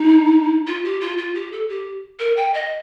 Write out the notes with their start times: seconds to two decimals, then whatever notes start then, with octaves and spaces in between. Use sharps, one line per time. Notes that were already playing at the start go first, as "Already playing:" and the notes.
Already playing: D#4
0.67 F4
0.85 G4
1.01 F4
1.18 F4
1.35 G4
1.52 A4
1.69 G4
2.20 A#4
2.37 G5
2.54 D#5